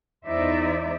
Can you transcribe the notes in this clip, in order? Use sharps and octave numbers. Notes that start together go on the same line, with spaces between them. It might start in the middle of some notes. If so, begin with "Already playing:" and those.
E2 D#4 E4 C5 D5 E5